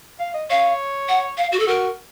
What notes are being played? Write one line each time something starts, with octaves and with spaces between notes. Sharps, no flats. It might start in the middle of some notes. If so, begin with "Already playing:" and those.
F5
D#5
C#5 F5
F#5
F5
F#4
A4
F#4 A#4